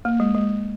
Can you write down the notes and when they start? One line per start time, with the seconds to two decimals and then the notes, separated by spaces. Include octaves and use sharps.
0.05 A#3
0.20 G#3
0.35 G#3